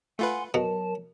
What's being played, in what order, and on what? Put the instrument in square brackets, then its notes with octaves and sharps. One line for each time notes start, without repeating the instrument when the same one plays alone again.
[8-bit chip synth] A3 F4 B4 [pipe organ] F#5 G#5 C6
[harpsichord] B2 [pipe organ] F#3 A5 [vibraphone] A#4